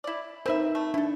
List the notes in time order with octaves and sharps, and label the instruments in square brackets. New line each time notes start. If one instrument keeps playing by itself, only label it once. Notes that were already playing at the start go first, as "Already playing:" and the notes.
[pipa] E4 D5
[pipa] C4 B4 E5 [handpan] D#4 A#4
[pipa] A3
[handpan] D4 [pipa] E4 A4